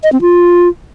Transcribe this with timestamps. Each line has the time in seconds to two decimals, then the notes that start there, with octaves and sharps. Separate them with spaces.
0.03 D#5
0.12 C4
0.21 F4